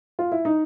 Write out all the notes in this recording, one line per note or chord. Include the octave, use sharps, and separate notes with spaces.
F4
E4
D#4